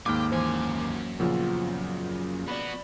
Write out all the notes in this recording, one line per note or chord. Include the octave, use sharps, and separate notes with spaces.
D#2 G#2 A#3 G5 G#5 D6 F6
F#2 E3 C5 G#5
A#2 C#3 F3 B3 F4
B3 F#4 D5 B5